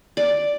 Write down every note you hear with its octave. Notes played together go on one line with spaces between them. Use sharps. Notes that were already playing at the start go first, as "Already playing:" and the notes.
D5